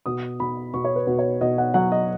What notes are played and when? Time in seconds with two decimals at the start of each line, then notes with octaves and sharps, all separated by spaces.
0.06 B2 D#6
0.40 B2 B5
0.74 B2 C#6
0.84 C#5
0.96 B4
1.07 B2
1.19 C#5
1.41 B2 D#5
1.58 F#5
1.74 F#3 F#5
1.92 D#5